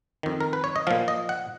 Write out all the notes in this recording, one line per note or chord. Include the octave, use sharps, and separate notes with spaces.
F2 D#3
A#4
B4
C#5
D#5
A#2 F3 F5
D#5
F#5